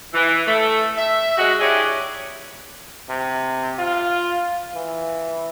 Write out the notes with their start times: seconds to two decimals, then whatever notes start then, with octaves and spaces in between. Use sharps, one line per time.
0.14 E3
0.47 A3
0.97 E5
1.37 G#3 F#4
1.60 D4 E4 G4 G#4 C#5 D#5
3.09 C3
3.79 F4
4.75 E3